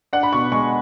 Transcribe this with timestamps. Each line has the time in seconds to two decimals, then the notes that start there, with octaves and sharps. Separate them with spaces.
0.13 D4 F#5
0.23 B5
0.33 B2 C#6
0.52 G#3 C#6